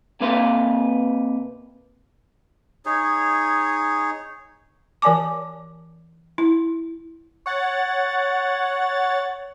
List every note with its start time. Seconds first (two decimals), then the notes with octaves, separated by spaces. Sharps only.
0.20 C3 A#3 B4 F5 C6
2.86 D#4 G#4 C#5
5.02 E3 A#4 D5 G#5 A5 D6
6.38 E4
7.46 C#5 F#5 A6